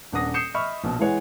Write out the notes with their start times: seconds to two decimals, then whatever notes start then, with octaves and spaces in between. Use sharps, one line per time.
0.12 D#1 D4 F#5 D#6 A#6
0.34 D#6 G6 C7 C#7 E7
0.54 D#5 E5 B5 C#6 F6
0.84 A#1 B2
0.99 E3 G#3 C#5 F#5